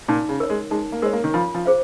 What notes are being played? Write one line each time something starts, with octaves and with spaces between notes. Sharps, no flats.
A#2 D#4
C#3
A#4 C#5
G#3
G#3 D#4
A#3
G#3 A#4 C#5
A#3
D#3
F3 F4
F3
G#4 C5 F5